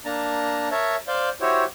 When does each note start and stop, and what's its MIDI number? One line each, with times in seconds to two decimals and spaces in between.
0.05 0.69 58
0.05 0.69 62
0.05 0.69 81
0.05 0.69 82
0.71 0.96 70
0.71 0.96 73
0.71 0.96 76
0.71 0.96 81
1.08 1.29 72
1.08 1.29 74
1.08 1.29 77
1.08 1.29 91
1.41 1.64 64
1.41 1.64 66
1.41 1.64 67
1.41 1.64 72
1.41 1.64 73